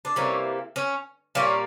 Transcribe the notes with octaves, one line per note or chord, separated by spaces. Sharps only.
D4
C3 E3 G3 A#3 C#4
C#4
A#2 G3 A#3 C#4